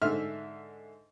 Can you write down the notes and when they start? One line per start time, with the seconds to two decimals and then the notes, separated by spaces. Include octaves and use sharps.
0.02 G#2 D3 E5 F6